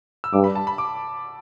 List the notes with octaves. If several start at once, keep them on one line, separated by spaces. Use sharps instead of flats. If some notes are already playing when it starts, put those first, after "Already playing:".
E6
G2 D6
B5
A5
B5
D6